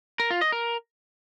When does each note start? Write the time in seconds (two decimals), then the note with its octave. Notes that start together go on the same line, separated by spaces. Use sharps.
0.20 A#4
0.31 F4
0.41 D#5
0.52 A#4